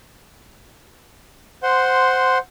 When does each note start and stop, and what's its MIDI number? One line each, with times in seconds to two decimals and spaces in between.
1.63 2.38 72
1.63 2.38 78
1.63 2.38 84